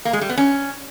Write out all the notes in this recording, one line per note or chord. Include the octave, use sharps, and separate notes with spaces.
A#3
G#3
G3
B3
C#4